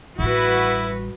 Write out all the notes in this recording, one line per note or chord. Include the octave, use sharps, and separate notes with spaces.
A1 G3 E4 F#4 B4